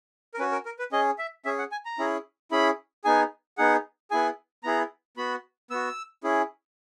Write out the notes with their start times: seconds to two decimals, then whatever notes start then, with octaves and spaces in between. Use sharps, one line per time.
0.34 A#4
0.39 C#4 F#4 B4
0.52 A#4
0.65 A#4
0.79 B4
0.92 C#4 G#4 D#5
1.18 E5
1.45 C#4 G#4 E5
1.58 F#5
1.71 G#5
1.85 A#5
1.99 C#4 E4 G#4
2.51 C#4 E4 G#4 B5
3.04 B3 D#4 G#4 G#5
3.58 B3 D#4 G#4 F#5
4.11 B3 E4 G#4 G#5
4.63 B3 E4 G#4 A#5
5.17 B3 F#4 B5
5.70 B3 F#4 E6
6.23 C#4 E4 G#4